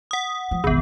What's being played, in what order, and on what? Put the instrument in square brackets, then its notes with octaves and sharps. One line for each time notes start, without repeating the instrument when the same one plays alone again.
[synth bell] F#5 D#6
[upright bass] F3
[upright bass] E1 A1 [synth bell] D#3 B3